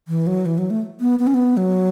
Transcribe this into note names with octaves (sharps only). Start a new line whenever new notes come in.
E3
F#3
E3
F#3
A3
B3
B3
C#4
B3
F#3